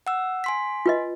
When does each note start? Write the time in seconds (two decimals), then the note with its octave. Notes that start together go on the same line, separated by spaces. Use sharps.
0.07 F#5 E6
0.44 G#5 C6 B6
0.86 F4 B4 D#5